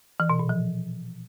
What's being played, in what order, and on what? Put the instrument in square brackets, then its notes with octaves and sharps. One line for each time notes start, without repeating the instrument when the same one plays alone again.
[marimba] E3
B2
A#2
F3